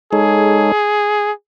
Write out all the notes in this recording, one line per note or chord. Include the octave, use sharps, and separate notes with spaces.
G#3 D#4 G#4 A4 C#5